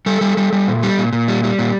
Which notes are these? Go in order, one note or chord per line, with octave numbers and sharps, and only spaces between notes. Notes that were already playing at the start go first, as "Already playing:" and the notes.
G3 A4
G3
G3
G3
A#2
G3
A#2
A#2
G3
G3
A#2